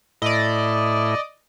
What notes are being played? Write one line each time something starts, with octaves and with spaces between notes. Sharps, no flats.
A2 E4 D5 D#5